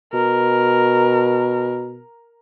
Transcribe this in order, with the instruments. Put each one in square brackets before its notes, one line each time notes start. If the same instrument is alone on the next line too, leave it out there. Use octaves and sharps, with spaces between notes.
[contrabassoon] B2 [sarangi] A#4